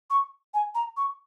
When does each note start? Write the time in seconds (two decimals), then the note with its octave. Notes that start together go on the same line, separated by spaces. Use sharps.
0.10 C#6
0.54 G#5
0.75 A#5
0.97 C#6